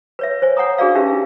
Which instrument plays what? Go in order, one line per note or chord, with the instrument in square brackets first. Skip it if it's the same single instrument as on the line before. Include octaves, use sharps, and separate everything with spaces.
[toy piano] B4 C#5 E5
C5 C#5 G#5
C#5 F#5 G#5 A#5 D#6
D4 F#4 G#4 A#4 D5 F5
C#4 D#4 G4 B4 E5 F5